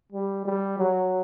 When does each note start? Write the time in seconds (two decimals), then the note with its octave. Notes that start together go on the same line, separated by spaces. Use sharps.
0.12 G3
0.45 G3
0.79 F#3